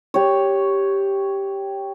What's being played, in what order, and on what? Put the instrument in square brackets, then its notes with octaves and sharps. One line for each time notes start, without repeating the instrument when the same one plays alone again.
[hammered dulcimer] G4 C#5